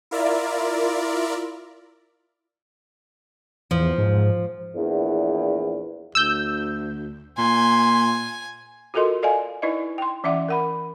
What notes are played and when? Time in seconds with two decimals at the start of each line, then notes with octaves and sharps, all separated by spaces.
0.11 E4 F4 A#4 D5 E5
3.71 E2 F3
3.98 G#2
4.76 A#1 E2
6.15 D2 E6 G6
7.38 A#2 G#5 C6
8.94 F4 F#4 A4 A#4 D#5 C6
9.23 A4 D5 D#5 F5 G#5
9.62 D#4 E4 B4 D5 D#5
9.98 G5 C6
10.24 E3 C#4 D5 E5 F#5 D6
10.49 A#4 F#5 B5